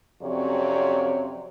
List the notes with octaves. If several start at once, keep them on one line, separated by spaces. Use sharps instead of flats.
F2 C3 F#3 C#4 C#5 D5